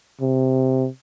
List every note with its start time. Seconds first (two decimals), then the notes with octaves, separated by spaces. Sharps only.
0.21 C3